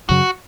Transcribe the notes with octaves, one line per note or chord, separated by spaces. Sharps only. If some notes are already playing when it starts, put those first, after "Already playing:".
F#2 C#3 F#3 F#4